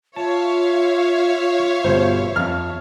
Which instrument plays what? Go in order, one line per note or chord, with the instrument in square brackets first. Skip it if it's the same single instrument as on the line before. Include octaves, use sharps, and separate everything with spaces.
[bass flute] F4 [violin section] C#5 E5 F5 [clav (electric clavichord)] A5
[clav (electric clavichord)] G1 B2 [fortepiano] C5
[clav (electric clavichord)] F2 [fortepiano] F6